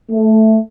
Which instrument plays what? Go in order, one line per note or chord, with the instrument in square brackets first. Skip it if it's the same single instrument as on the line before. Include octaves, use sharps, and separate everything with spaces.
[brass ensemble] A3